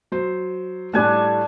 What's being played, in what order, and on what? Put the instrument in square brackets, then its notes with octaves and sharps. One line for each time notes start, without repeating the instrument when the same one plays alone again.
[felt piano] F#3 C5
[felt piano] A2 G3 A3 [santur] D4 G#5 A5